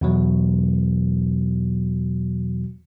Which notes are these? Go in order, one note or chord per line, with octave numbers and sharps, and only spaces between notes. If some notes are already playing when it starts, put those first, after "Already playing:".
E2 B2 F#3